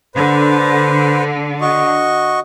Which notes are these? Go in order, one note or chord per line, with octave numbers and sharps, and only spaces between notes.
D3 B4 C5
F#4 D#5 C#6